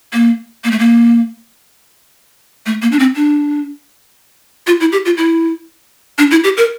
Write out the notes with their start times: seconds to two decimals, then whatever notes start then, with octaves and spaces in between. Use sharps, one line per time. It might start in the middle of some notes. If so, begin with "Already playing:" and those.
0.13 A#3
0.64 A#3
0.71 A3
0.79 A#3
2.66 A3
2.82 A#3
2.92 D4
2.99 C4
3.16 D4
4.67 F4
4.81 E4
4.92 G4
5.05 F4
5.18 E4
6.18 D4
6.31 E4
6.44 G4
6.57 A#4